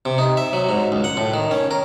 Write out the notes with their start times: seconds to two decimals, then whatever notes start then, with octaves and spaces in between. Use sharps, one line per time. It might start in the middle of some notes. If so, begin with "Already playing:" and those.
0.05 C3
0.18 D#4
0.37 E5
0.53 F#3
0.69 G#2
0.92 C#2
1.04 F#5
1.17 A2
1.34 D#3
1.51 C#4
1.71 A#4